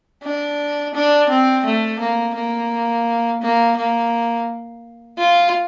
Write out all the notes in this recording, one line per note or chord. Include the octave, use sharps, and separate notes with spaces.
D4
D4
C4
A3
A#3
A#3
A#3
A#3
F4